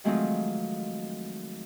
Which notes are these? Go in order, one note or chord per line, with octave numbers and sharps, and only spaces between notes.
D#3 F3 F#3 G#3 A3 C4